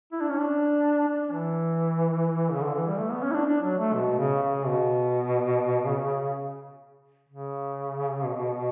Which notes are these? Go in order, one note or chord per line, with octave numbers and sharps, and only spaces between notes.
E4
D4
C#4
D4
D4
E3
C#3
D3
E3
G3
A3
B3
C#4
E4
D4
D4
F#3
A3
B2
C#3
C#3
B2
C#3
C#3
B2